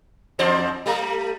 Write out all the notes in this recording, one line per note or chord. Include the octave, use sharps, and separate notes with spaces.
E2 C5 D5
G3 A3